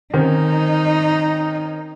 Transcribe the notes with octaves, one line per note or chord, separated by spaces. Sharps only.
D#3 C4 C#4 D#4